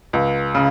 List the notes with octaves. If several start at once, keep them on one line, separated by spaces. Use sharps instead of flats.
C#2
C#3